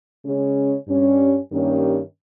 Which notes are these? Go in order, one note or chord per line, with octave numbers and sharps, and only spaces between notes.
C#3 G#3 C#4
G2 G3 C#4
G2 D#3 A#3 C#4 G4